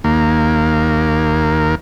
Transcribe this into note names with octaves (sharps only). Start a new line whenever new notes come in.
D#2 A#3